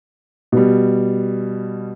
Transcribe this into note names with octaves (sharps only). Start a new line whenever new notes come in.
B2 G3